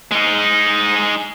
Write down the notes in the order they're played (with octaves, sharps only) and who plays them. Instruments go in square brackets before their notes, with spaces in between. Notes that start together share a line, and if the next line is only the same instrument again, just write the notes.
[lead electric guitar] G#3 D#4